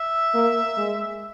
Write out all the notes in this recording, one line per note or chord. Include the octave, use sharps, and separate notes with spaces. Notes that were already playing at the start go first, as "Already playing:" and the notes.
Already playing: E5
A#3
G#3